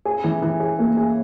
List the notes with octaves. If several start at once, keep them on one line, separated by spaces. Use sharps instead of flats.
G#4
E3
E3
G#4
A#3
G#4